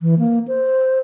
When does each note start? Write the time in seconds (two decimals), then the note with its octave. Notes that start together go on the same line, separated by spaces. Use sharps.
0.01 E3
0.19 A#3
0.48 C5